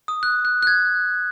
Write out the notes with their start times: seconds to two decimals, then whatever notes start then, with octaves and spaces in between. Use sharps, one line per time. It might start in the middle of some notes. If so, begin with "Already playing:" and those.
0.08 D#6
0.23 F#6
0.45 F#6
0.62 F#6
0.67 G#6